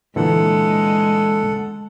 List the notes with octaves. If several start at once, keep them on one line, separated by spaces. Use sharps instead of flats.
A#2 D3 E3 G#3 A4 F#5